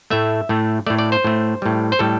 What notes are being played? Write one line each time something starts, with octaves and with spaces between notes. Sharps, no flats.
A2 A3 E5
A2 A3
A2 A3 D5
D5
C5
A2 A3
A2 G3
C5
A2 G3 A4